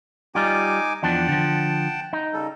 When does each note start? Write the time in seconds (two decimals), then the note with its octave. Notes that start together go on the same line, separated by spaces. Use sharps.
0.35 G3 D#4 F4 G#5 D6
1.03 E2 F3 D4 F#5 G5 A5
1.28 D3 F3
2.13 D#4
2.33 C#3 G3 A4